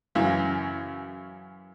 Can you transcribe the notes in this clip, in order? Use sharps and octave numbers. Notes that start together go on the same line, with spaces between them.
F#2 C#3 E3